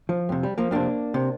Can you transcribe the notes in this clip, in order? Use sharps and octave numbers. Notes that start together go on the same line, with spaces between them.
F3
F2 C3
G3
F3 A#3
F2 C3 A#3 D4
C3